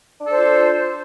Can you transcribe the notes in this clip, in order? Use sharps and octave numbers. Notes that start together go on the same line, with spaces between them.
D4 F4 A4 C5